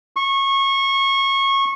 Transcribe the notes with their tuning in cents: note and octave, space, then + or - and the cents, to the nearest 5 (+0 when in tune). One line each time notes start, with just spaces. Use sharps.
C#6 -20